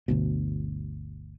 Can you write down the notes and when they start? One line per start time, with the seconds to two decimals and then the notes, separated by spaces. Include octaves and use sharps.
0.08 G1 D2 B2